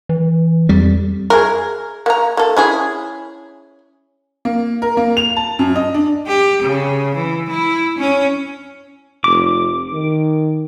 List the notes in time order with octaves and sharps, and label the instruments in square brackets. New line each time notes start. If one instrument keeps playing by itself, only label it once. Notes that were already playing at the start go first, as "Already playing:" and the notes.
[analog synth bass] E3
[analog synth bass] F2 [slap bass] G3
[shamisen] G#4 A#4
A#3 A#5
A#3 A4
C#4 E4 G#4
[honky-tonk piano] A#3
A#4
A#3
F7
A5
F#2
D#5
D4
[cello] G4
C#3
E3
E4
C#4
[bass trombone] F1 [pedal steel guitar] D6
[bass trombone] D#3